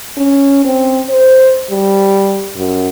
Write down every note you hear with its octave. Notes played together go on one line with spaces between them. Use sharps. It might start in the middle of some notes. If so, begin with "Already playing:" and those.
C#4
C4
C5
G3
F#2